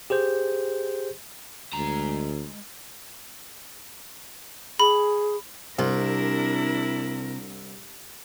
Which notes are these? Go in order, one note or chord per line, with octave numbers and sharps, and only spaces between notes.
G4 G#4 C5 G6
D2 G#3 A#5
G#4 B5
C2 C3 D4 E4 A#4